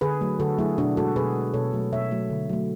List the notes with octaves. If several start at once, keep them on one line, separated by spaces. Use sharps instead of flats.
D3 G#4 B4
F#3 A3
D3 F#4 A4
F#3 A3 E4 G#4
B2 D4 F#4
G#3 F#4 A4
B2 G#4 B4
G#3
B2 A4 C#5
F#3 A3
B2 C#5 E5
F#3 A3
D3
F#3 A3